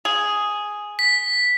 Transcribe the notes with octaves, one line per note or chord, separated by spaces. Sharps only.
G#4
B6